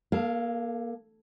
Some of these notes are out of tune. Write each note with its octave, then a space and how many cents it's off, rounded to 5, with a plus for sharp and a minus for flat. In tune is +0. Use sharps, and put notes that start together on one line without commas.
A#3 +25 A4 -5 F5 -10